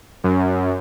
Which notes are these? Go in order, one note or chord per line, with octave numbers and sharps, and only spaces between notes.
F#2